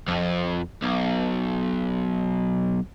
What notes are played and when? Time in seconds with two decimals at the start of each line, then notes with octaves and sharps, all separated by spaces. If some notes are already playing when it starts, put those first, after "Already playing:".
0.08 F2
0.82 B1